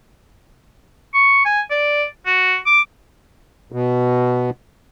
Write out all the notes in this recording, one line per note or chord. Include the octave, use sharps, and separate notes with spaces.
C#6
G#5
D5
F#4
D6
B2